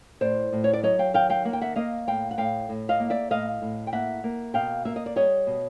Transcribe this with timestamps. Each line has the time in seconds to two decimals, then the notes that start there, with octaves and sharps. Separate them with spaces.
0.21 A2 C5 D5
0.52 A2
0.64 C#5
0.73 D5
0.83 F#3 C#5 D#5
0.99 F5 G5
1.14 D#3 F5 G5
1.30 F5 G5
1.45 A#3 F#5
1.53 G5
1.61 E5 F#5
1.76 A#3 D#5 F5
2.07 A2 F5 G5
2.31 F#5
2.38 A2 F5 G5
2.69 A2
2.89 D#5 F5
3.00 A#3
3.10 D5 E5
3.30 A2 D#5 F5
3.62 A2
3.87 G5
3.92 A#3 E5 F#5
4.24 A#3
4.54 B2 F5 G5
4.85 A#3 E5
4.96 D#5
5.06 D5
5.16 G3 C#5 D#5
5.47 B2